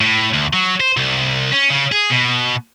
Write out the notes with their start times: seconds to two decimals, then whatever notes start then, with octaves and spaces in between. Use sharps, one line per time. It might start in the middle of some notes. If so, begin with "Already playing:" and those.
0.01 A2
0.33 D2
0.53 F#3
0.80 C5
0.97 C2
1.53 C#4
1.71 C#3
1.92 G#4
2.10 B2